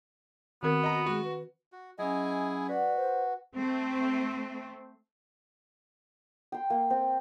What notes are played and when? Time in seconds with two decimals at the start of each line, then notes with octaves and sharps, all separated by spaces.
0.63 D#3 B3 C4 F#4 A#4
0.84 D#5 A#5
1.06 G#3 F#4
1.25 B4
1.72 F#4
1.99 F#3 C#4 E4 G#4 D#5 G#5
2.69 F#4 B4 D5 F#5
2.97 C5
3.54 A3 C4
6.52 G5 C6
6.70 A#3
6.90 C4